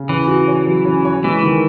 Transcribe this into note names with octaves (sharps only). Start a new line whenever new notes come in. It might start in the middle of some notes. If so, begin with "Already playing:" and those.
Already playing: C#3
E3 C#4
F#4
C#5
F#3
C#4
C#5
E3 G#3
D#3